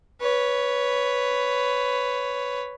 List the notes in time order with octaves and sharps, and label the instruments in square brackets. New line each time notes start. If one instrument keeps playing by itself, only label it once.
[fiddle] B4 C#5